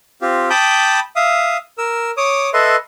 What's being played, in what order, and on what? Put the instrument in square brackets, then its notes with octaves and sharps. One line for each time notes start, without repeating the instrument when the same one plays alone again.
[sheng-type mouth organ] C4 F4 G4
G5 A5 B5 D6 D#6 G6
E5 F5 D#6
A#4 E6
C#5 D6 D#6
A4 B4 D#5 E5 C6